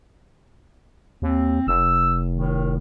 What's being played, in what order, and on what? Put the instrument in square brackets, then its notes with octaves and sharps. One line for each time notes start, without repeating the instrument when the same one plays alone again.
[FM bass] D#2 [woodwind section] C4
[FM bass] F1 [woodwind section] E6
[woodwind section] A2 D#3